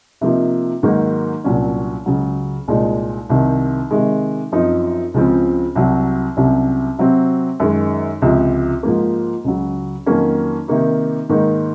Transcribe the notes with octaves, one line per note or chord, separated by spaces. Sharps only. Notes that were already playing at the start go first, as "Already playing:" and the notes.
C3 F3 A#3 D#4
G#2 D#3 F#3 A#3
C2 A#2 F#3 C#4
C#2 C#3 F#3
C2 A#2 G#3 D#4
C2 C3 D#3
C3 D#3 G#3
F#2 F3 C4 D#4
C#2 C#3 F3 C4
C2 C3 F#3
C2 C3 F#3 C#4
C3 F#3 C4
F#2 D#3 G#3 D#4
C#2 C3 F3
G#2 F3 A#3
C#2 C#3 F#3
F2 D#3 F#3 A#3 C#4
C3 D#3 A#3 D#4
G#2 D#3 A#3 D#4